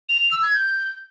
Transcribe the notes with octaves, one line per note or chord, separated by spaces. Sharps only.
F7
F7
E6
G#6
G6